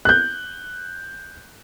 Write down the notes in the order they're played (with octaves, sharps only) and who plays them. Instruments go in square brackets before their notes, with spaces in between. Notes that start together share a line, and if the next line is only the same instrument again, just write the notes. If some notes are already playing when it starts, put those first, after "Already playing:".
[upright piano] F#6 G6